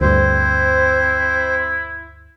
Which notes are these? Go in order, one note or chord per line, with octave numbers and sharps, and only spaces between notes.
D2 G2 C4 E4 C5